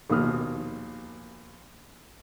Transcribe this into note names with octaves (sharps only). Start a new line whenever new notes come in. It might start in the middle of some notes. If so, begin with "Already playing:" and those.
A#1 D#2 B2 D#6 F6